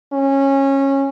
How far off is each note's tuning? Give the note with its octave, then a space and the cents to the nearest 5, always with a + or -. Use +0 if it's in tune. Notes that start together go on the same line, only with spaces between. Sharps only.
C#4 -20